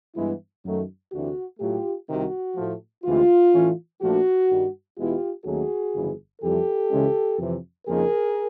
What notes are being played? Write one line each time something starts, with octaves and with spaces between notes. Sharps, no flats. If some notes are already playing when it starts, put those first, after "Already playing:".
G2 E3 G#3 B3 E4
F#2 D#3 F#3 A3
D2 C3 E3 A3 D4 F#4
A2 F#3 A3 F4 G4
C2 C3 D#3 F#4
A2 F3 A3
D2 C3 E3 G#3 F4
A2 E3 A3 C#4
A#1 A#2 F3 A3 D4 F#4
G2 D#3 G3
E2 B2 G#3 B3 E4 F4 G4
D#2 D#3 F#3 A3 C#4 F#4 G#4
G1 F2 C#3 E3
F2 C3 E3 G3 G4 A4
C#2 C#3 E3 G#3 C#4
F2 C3 E3
F2 C#3 F3 A#3 D#4 G#4 A#4